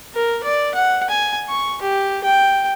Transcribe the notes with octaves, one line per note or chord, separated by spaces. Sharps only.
A#4
D5
F#5
G#5
C#6
G4
G5